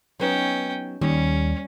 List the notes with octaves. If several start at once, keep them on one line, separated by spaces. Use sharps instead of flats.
F#3 B3 C#4 D#4 G5
D#2 G3 C#4